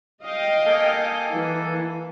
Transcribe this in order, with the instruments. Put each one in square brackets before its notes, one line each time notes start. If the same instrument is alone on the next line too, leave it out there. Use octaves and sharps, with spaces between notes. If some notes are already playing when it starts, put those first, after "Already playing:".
[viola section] D#5 F5 G5
[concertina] A#3 A4 G#5
[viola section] E3